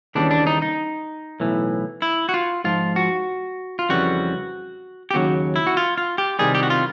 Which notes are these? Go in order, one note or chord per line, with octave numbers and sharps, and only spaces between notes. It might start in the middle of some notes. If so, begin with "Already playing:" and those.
D#2 C#3 E3 G3 D4
D4
D#4
D#4
B1 A2 E3
E4
F#4
F4
G#2 F3 F4
F#4
F4
F2 C#3 E3 G3 F#4
G4
D#2 C#3 F#3 F#4
E4
F#4
F4
F4
G4
C2 C3 D#3 G3 G#4
G4
F#4
F4